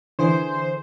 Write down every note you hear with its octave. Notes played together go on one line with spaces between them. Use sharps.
D3 E3 G#4 C5